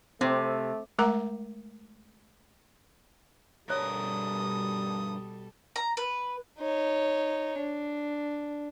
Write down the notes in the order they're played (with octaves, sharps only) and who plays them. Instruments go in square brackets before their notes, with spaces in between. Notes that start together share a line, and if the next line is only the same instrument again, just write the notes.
[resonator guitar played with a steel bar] C3 [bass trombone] A3 [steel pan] C4
[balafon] G#3 A3 A#4 F#5 A#5 D6
[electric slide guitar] G2 A#4 [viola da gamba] B2 G3 A4 [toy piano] C5 C#5 [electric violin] D#6
[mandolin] A#5
B4
[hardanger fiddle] D#4 C#5
D4